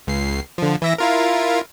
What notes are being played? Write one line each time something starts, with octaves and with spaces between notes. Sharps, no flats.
C#2 C7
D3 F3
E3 E5 A#6
E4 F4 A#4